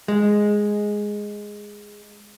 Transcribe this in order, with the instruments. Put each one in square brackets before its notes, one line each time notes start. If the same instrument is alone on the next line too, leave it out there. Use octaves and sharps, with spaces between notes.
[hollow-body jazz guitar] G#3